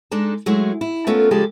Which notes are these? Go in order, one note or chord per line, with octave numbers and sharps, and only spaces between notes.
G#3 D4 D#4 A4
F#3 G#3 A3 E4 G#4
E4
A3 B3 C#4 F4 A4 A#4
C#3 F3 G#3 G4 A4 D5